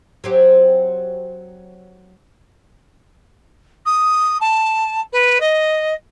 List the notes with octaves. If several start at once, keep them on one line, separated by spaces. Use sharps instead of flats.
F#3 C4 G4
D#6
A5
B4
D#5